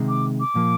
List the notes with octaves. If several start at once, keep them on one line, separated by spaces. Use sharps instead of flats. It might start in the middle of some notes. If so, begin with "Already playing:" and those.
Already playing: C3 D#3 G#3
D6
D6
A#2 F3 A#3